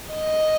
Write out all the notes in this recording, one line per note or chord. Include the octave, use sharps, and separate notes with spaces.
D#5